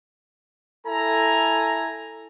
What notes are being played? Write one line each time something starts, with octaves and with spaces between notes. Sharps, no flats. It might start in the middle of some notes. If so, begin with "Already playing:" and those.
E4 A4 G#5 A#5